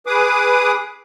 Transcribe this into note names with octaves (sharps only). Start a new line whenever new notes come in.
G#4 B4 D6 D#6